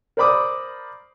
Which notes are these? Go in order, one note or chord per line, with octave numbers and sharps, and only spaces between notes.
A#4 C5 D5 B5 D6 D#6